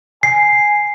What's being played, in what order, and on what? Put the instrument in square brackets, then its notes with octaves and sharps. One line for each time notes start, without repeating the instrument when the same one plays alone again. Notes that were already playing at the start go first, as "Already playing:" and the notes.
[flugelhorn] G#5 [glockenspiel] C7